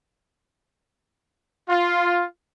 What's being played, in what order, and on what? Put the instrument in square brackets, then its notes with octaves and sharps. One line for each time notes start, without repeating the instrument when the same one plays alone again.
[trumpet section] F4